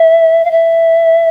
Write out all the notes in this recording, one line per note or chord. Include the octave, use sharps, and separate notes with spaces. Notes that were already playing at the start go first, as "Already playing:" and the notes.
Already playing: E5
F5
E5